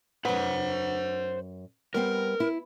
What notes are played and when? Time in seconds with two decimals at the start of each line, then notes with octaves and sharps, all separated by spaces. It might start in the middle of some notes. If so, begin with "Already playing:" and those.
0.25 F#2 B4 C5 F#5
1.94 G3 B3 C4 A#4
2.40 E4